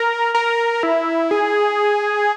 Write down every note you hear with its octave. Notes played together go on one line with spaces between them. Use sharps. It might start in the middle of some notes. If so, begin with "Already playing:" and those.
Already playing: A#4
A#4
E4
G#4